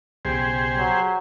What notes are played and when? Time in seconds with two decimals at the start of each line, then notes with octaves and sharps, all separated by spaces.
0.25 B1 C#3 G4 G#4 C5
0.78 F#3